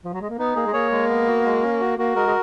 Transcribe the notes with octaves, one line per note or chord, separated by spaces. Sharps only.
F3
F#3
G#3
A#3
B3 D#4
A#3 G#4
G#3
A#3 C#5
G#3
B3
F#4
G#3
C#4
F#4
A#3 F#4
G#3 A#4
G#3